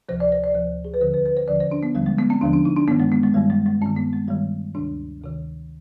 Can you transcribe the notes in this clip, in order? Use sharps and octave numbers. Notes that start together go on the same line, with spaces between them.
D2 C3 F3 C5
D5
C5
D5
D2 C3 F3 C5
G#4
B4
D#2 D3 F3 C5
B4
B4
C5
D#2 D3 F3 D5
C5
D4
B3
D#2 D3 F3 G3
G#3
B3
C4
D#2 D3 F3 D4
D4
D#4
D4
G2 D#3 B3
G#3
B3
G#3
G2 D#3 G3
G#3
G#3
G2 D#3 C4
B3
G#3
G2 D#3 G3
D2 C3 D#3 D4
D2 C3 D#3